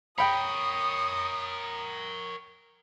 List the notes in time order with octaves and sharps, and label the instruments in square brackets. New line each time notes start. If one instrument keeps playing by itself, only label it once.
[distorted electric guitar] A#4 C#5 [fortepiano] G5 B5 [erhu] D#6